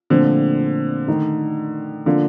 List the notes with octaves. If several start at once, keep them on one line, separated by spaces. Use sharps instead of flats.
A#2 D3 F3 A3 C4
D#3 A3 D#4
D3 F3 A#3 D4 F4